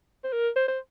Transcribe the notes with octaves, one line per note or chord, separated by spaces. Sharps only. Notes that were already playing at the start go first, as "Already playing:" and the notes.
C5
A#4
C5
C5